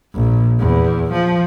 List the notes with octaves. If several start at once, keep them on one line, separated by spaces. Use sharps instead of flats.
A#1
E2
F3